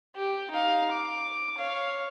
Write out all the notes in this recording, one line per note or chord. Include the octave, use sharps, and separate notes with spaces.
G4
D#4 F5
D6
C#5 F5